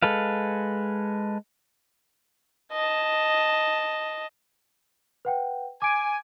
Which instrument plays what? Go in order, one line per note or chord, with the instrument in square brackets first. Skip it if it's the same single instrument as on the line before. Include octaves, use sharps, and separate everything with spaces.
[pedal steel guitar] G#3 A4 B4 F5
[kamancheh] D#5 A5
[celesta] B4 F#5 G5
[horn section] G#5 [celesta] D6 D7